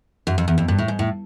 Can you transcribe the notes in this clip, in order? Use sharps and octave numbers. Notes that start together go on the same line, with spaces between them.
F#2
F2
E2
F2
G2
A2
G#2
A2